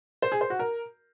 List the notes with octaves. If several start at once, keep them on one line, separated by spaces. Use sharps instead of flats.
C5
G#4
C5
F#4
A#4